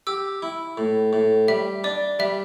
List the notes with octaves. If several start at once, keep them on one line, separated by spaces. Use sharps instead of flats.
G4 E6
E4
A2
A2
G3 E5
D4 D5
G3 E5